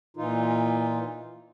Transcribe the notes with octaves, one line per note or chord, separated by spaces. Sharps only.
A#2 E3 D#4 F4